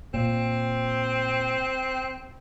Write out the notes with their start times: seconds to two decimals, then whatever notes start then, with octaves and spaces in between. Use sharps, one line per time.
0.14 A#2 C4